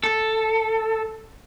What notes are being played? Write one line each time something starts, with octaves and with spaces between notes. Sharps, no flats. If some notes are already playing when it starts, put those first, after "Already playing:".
A4